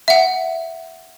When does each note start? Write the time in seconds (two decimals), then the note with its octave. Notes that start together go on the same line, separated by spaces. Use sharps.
0.08 E5 F#5